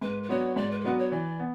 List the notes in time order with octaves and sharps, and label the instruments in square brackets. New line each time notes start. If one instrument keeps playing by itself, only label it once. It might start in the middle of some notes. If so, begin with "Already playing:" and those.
[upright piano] G#2 [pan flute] B4
[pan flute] B4
[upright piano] F#3 B3 D4 F#4 [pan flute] C#5
[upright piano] G#2 [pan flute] D5
[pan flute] B4
A4
[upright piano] F#3 B3 D4 F#4 [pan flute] B4
[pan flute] C#5
[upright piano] E3 [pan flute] D5
[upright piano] B3